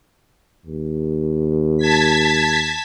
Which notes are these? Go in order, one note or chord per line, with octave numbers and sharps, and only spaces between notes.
D#2
A5 G#6 B6